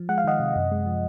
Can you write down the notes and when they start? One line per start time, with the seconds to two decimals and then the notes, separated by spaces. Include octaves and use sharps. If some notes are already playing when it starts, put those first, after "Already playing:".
Already playing: F3
0.09 G#3 F#5
0.18 F5
0.24 D#3 D#5 F#5
0.40 C3
0.56 F#2
0.71 G#3
0.86 F3